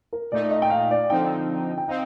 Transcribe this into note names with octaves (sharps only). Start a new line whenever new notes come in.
A#4
A#2 A3 D#4 D5
D#5
G5
F5
D5
D3 F3 C4 D#4 G5
G5
C4 D#4 F5